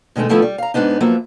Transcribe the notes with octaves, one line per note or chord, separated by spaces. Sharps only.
B2 D#3 G#3 A3 D#4
D#3 F3 A3 B3 E4 B4
G3
F5 A#5
G#2 D3 B3 D4 D#4
F3 F#3 A#3 B3 E5